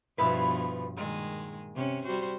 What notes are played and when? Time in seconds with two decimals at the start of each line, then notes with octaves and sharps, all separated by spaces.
0.18 G2 B2 F3 B3 E4 B4
0.97 A#2 D#3 G#3
1.76 C3 C#4
2.05 G3 F#4 C5